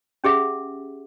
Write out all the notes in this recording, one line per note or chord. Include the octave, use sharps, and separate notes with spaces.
C#4 G4 G#4 E5 F#5